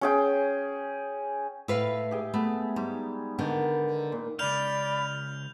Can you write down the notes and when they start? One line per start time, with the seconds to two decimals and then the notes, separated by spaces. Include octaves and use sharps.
0.01 C#4 G#4 G5
1.68 A2 B4 E5 F5
2.11 G4 G#4 G5
2.34 A3 B3
2.76 G#2 G3
3.39 D3 D#3 B3 G5
4.12 A#2
4.39 C#2 F#2 D5 B5 F6 G6 F7